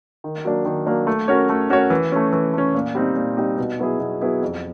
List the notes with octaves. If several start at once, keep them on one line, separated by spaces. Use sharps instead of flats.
D#3
F#3 A#3 D4
D#3
F#3 A#3 D4
A3
C#4 F#4 A#4 C#5
A3
C#4 F#4 A#4 C#5
E3
A3 C#4
E3
A3 C#4
A#2
G3 C4 D#4
A#2
G3 C4 D#4
B2
F#3 B3 E4 G#4
B2
F#3 B3 E4 G#4
F2